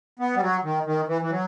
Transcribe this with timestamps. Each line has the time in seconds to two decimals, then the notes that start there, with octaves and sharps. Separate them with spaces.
0.19 B3
0.36 G3
0.41 F#3
0.64 D#3
0.86 D#3
1.08 E3
1.22 E3
1.31 F#3